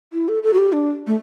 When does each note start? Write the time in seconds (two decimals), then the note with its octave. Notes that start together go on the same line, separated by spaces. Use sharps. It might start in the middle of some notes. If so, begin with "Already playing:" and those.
0.13 E4
0.28 A4
0.43 A4
0.53 F#4
0.58 G4
0.73 D4
1.07 A3